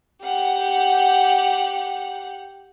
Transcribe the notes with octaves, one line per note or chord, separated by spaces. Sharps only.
G4 F#5